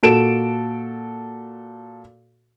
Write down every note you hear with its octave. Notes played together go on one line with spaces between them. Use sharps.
A#2 F#4 A4 D7 E7